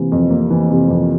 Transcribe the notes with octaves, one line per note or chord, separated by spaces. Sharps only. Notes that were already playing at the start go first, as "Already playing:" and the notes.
Already playing: C3 E3 A#3
F2
A#3
E3
C3
F2